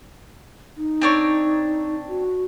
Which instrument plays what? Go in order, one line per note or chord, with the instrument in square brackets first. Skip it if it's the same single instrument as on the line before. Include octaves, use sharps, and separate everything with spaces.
[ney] D#4
[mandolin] C4 D4 C#5
[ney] F#4